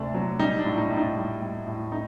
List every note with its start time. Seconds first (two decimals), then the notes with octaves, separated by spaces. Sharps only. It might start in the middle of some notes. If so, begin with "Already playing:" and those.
Already playing: D2 C3 A3 D4
0.14 F#3
0.39 G3 D#4
0.58 D4
0.65 A2
0.78 D#4
0.90 A2
0.97 D#4
1.16 G3
1.41 G3
1.67 A2
1.92 A3 D#4